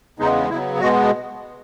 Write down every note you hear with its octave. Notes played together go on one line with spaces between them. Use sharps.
E2 C#3 G#3 B3 D#4
C#3 F#3 B3 E4
B2 G#3 B3 F#4